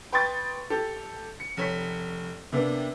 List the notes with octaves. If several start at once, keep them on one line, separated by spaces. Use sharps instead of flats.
B4 G5 C6 C#6 D#6 A6
G4 A4
C#7
F1 C#5 B6
C3 A#3 B3 D4